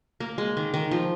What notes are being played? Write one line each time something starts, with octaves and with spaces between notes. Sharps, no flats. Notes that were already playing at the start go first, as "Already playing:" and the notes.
A#3
G#3
D#3
D#3
F3